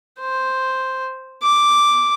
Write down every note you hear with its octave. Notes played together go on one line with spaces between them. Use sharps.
C5
D6